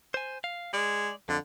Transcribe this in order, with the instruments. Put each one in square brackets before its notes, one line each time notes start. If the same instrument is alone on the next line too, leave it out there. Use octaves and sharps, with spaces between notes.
[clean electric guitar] C5 G#5
F5
[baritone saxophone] G#3 [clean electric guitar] D5
[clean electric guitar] F2 [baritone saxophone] D3